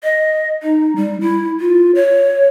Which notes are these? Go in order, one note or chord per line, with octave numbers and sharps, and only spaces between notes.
D#5
D#4
G3
E4
F4
C#5